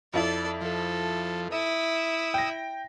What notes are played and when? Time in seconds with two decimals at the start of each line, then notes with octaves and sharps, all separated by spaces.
0.14 F2 E4 A4 D5
0.61 F3 A4
1.52 E4 E5 D#6
2.34 G5 A#6